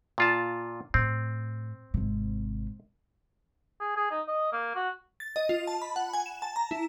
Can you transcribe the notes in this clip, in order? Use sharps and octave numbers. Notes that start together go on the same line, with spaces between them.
A#2 F4 A5
A2 C4
G#1 C3
G#4
G#4
D#4
D#5
A#3
F#4
A6
D#5
F4
A5
B5
F#5
G#5
E7
A5
A#5
E4